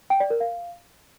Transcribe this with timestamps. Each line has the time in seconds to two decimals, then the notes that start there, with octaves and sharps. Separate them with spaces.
0.10 G5
0.20 D5
0.30 A#4
0.40 F5